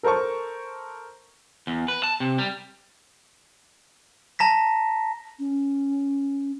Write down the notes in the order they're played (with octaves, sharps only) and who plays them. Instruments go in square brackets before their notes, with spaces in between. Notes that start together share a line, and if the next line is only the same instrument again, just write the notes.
[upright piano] A4 A#4 C5 A5 C#6
[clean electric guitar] E2
B4
A5
C3
G3
[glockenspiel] A5 A#5 A#6 B6
[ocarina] C#4